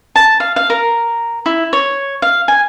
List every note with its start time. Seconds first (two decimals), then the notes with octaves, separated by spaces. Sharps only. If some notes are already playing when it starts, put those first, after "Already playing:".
0.16 A5
0.40 F5
0.56 F5
0.70 A#4
1.46 E4
1.73 C#5
2.22 F5
2.48 G#5